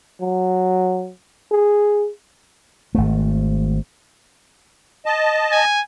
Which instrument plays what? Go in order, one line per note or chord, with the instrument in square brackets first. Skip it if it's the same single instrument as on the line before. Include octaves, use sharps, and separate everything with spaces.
[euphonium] F#3
G#4
[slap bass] G#1 A3
[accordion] D#5 A5
[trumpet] G#5